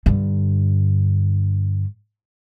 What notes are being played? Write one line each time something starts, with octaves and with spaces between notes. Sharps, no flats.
G2 D3